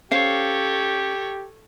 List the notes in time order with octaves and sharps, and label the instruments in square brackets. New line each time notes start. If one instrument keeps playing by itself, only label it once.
[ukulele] C#4 C5 F5 [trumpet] G4 [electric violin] A4 C#5